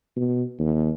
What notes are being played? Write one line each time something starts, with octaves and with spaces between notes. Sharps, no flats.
B2
D#2